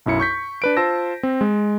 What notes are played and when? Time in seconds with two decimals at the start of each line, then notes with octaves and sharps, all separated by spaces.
0.06 B1 F#2 E4 C#7
0.20 C#6 G6 B6
0.62 D4 B4 D7
0.77 F4 C5 A5 E6 A#6
1.23 C4
1.41 G#3